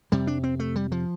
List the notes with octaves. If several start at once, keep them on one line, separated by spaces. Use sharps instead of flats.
F2 C3 G3
D4
C4
A3
G3
F3